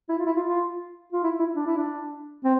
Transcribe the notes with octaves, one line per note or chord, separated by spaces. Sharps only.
E4
F4
E4
F4
F4
F4
E4
E4
D4
E4
D4
C4